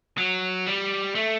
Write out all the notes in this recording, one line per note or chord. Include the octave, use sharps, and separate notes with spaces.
F#3
G3
A3